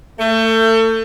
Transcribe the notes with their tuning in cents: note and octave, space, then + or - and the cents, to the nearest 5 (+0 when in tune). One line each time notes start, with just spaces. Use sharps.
A3 +30